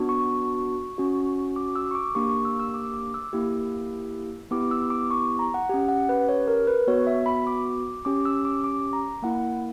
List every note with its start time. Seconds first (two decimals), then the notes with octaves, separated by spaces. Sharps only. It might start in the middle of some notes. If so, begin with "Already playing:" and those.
Already playing: B3 D4 F#4
0.09 C#6
0.98 C#4 F#4
1.56 D6
1.76 E6
1.91 C#6
1.95 D6
2.15 A#3 D4 G4 C#6
2.29 C#6
2.45 E6
2.60 E6
2.74 D6
2.94 D6
3.14 E6
3.33 A#3 E4 G4
4.51 B3 E4 G4 D6
4.71 E6
4.90 D6
5.11 C#6
5.39 A#5
5.54 F#5
5.69 C#4 G4
5.88 F#5
6.09 B4
6.29 C#5
6.47 A#4
6.67 B4
6.87 B3 F#4 C#5
7.07 E5
7.26 B5
7.47 D6
8.05 C#4 G4 D6
8.25 E6
8.45 D6
8.64 D6
8.93 A#5
9.22 A#3 E4 F#5